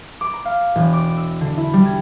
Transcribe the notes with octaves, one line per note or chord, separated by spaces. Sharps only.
D6
A#5
F5
E1
D6
E6
D3
E4
G3
G#6